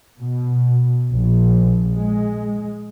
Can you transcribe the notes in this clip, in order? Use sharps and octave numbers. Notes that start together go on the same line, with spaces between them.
B2
A#1
G#3